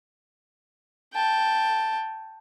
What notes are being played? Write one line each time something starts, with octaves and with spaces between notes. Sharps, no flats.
G5 A5